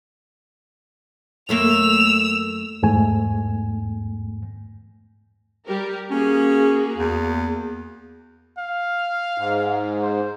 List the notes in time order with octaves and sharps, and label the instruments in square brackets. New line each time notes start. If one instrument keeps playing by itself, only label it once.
[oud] F#2 A3 A#3 [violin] E6 F7
[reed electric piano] E2 G#2 A3 G#5
[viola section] G3 G4 A#4
[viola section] A#3 F#4 G#4 [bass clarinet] C#4
[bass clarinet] E2
[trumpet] F5
[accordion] G#2
[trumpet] C5